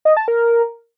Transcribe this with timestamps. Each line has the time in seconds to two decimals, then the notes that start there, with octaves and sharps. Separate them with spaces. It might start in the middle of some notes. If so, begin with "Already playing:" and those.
0.05 D#5
0.17 A5
0.28 A#4